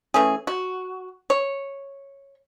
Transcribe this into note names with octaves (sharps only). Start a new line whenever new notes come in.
E3 A3 C#4 G#4
F#4
C#5